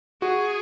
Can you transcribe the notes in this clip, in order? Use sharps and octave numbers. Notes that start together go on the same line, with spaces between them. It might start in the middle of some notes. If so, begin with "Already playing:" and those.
F#4 G#4